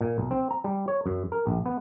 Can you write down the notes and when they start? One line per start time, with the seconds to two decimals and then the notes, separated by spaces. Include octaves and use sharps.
0.01 A#2
0.18 B1
0.31 C4
0.51 A#5
0.64 G3
0.88 C#5
1.06 F#2
1.32 A#4
1.47 A#1
1.66 B3